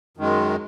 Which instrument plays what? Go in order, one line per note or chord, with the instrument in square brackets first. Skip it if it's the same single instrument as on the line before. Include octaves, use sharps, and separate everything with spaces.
[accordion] F#2 D#3 G#3